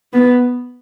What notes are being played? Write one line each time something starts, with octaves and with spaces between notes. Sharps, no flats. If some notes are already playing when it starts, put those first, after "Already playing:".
B3